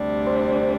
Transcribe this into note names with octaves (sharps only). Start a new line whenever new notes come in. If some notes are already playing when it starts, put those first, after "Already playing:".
Already playing: D2 C3 G3 D4
C5